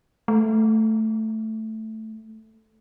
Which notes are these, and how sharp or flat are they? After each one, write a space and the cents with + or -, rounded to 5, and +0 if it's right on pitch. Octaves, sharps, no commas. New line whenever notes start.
A3 +0